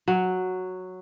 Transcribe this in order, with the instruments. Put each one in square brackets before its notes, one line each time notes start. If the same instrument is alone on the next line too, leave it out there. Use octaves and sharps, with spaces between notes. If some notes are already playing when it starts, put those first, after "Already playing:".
[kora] F#3